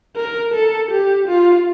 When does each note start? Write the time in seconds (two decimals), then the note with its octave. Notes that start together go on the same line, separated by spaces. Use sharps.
0.17 A#4
0.54 A4
0.91 G4
1.29 F4